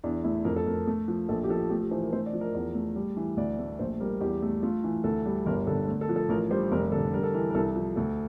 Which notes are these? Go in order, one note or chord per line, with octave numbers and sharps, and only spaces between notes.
E2 D4
A3 E4
F2 A#4
A4
A3 A#4
A3
F3
A#1 A4
G4
F3 A4
A3 G4
G4
E3 C5
A#4
A3 C5
D5
F3
A#4
E2
A3
G3
E3
D2 D5
A3
A#1 C5
G3 A#4
E2 G4
A3
A3 F4
E3
D2 A4
G3
G1 A#4
D3 A4
A3
A4
F3
A4
A1 A#4
G3 C5
F1 A#4
D3 A4
G3 A#4
A4
E3 A#4
A#4
C2 A4
F3
D2 A4